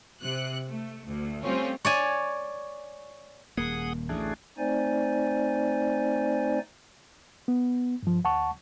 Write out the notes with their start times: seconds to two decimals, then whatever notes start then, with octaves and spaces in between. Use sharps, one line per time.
0.22 C3 F#6
0.69 A3
1.07 D2
1.43 G3 A3 C4 C#4 F4
1.85 C#5 D5 G#5
3.57 D#1 A#3 G#4 F#5 D#6
4.09 A1 D2 A3 D4 G#4
4.58 A3 C4 D#4 C5 D5 G#5
7.48 B3
8.03 G2 F3
8.24 D2 F#5 A5 C#6